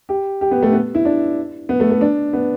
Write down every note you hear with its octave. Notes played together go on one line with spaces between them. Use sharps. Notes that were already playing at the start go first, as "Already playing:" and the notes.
G4
G4
B3
A3
B3
E4
D4
B3
A3
A3
D4
B3